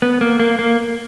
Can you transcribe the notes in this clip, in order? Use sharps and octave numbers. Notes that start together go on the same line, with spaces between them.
B3
A#3
A#3
A#3